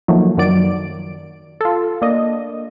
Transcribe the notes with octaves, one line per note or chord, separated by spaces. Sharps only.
D#3 F3 F#3 A3 A#3
F#2 D#3 F#3 D5 D7
F4 A4
A#3 D4 D#5